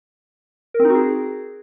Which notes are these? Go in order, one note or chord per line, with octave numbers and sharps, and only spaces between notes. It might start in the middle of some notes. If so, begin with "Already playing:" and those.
A#4
C4
D#4
F#4
G#4